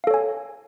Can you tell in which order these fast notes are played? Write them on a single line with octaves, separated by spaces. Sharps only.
F5 A4 C#5 G#5